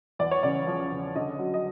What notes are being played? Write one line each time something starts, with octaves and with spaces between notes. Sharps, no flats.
E2 D5
C#5
C#3 D5
F3
C#3
D3 D#5
F#3
D#5